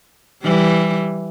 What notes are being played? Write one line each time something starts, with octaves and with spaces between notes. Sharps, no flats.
E3 G3